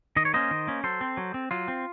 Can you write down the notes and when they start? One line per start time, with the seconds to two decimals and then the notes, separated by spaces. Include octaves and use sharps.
0.16 D#3 D#5
0.25 C#5
0.34 A#3 C#4 C5 D#5
0.51 D#3
0.67 A#3 C#4
0.84 F#3 A4 C5
1.01 C4
1.17 F#3
1.34 C4
1.51 F#3 F4
1.68 C4